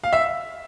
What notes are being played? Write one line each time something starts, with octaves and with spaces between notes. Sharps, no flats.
F5
E5